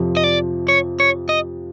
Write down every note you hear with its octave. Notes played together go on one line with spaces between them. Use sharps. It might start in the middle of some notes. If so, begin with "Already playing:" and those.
Already playing: F2 C3 F3
D#5
D5
C#5
C#5
D#5